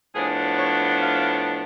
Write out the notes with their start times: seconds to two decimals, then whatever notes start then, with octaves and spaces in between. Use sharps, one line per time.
0.14 A2 F3 B3 D4 G#4
0.57 C#5
1.00 F5